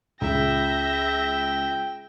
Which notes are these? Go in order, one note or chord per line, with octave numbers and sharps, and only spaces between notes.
C#2 E5 G5 A#6